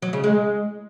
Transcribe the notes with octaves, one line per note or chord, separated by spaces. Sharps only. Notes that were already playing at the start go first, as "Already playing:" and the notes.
F#3
C#3
G#3